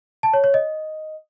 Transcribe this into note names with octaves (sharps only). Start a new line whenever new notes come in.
A5
C#5
C#5
D#5